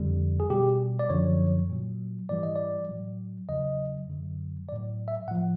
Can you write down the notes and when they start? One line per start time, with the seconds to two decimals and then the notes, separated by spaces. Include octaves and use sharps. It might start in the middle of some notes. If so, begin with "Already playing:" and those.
Already playing: F2 D3 G3
0.40 G#4
0.50 B2 G3 G4
0.99 D5
1.10 F#2 D3 F3 C#5
1.70 A#2 F#3
2.29 G#2 E3 G3 D5
2.43 D#5
2.56 D5
2.89 A2 F#3
3.49 E2 C#3 F#3 D#5
4.08 F#2 D3 F#3
4.68 F#3 D5
4.72 A2
5.08 E5
5.28 A2 F#5
5.31 F3